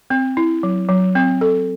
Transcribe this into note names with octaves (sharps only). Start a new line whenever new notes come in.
C4
E4
F#3
F#3
C4
A4